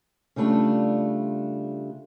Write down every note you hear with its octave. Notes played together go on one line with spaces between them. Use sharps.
C#3 G3 A3 D4 F4